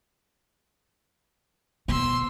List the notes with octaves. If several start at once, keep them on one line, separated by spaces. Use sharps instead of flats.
B2 C6 E6